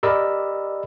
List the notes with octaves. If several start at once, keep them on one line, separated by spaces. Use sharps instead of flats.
G4 A#4 D5 D#5 B5 E6